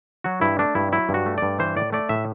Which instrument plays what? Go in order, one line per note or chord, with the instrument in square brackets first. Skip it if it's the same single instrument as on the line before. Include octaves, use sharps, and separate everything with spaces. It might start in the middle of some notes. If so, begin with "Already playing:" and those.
[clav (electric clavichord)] F#3 F#4
G2 E4
A3 D4
G2 E4
F#3 E4
G2
F#4
A3
G2 D5
E3 C5
A2 D5
A3 D5
A2 E5